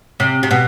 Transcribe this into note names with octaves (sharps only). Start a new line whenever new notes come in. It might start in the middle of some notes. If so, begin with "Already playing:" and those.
C3
C3
B2